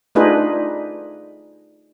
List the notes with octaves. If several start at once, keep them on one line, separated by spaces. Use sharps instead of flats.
A3 D4 D#4 F4 G#4 B4